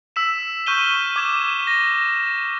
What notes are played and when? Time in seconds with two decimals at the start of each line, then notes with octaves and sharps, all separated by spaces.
0.16 E6 B6 E7
0.66 C#6 F6 G6 D#7 E7 G7
1.16 D6 G#6 E7
1.67 A#6